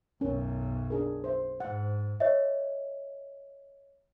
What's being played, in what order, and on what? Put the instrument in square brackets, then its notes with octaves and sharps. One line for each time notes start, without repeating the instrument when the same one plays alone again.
[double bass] B1 F#2 [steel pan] C#4 A#4
[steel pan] D4 G#4 A#4
C5 E5
[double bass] G#2 [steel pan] F#5
[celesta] C#5 D#5 E5